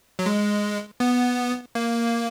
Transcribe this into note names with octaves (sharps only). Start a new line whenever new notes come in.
F#3
G#3
B3
A#3